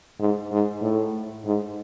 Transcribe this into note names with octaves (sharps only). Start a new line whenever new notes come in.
G#2
G#2
A2
G#2